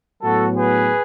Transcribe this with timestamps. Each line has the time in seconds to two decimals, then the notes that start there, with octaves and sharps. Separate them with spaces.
0.22 A2 F#3 B3 F#4 A4
0.57 G#4 B4